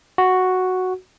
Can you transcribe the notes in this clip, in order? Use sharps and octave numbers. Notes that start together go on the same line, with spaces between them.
F#4